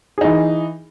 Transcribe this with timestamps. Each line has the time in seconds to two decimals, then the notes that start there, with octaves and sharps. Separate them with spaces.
0.18 G#4
0.21 D#4
0.25 E3